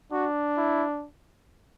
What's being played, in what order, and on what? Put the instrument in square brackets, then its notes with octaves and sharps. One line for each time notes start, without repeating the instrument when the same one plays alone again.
[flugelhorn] D4 [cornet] F#4
[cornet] E4